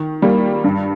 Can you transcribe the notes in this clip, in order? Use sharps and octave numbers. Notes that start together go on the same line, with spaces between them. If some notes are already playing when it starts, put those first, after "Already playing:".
Already playing: D#3
G3 A#3
G2